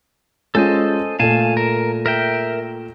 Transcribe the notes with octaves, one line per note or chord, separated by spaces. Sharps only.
G#3 C#4 F4 A4 C5 D#5
A#2 A3 F5 G#5 A5
A#4
A#4 E5 G5